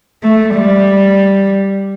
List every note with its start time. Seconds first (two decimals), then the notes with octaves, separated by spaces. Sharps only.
0.23 A3
0.55 G3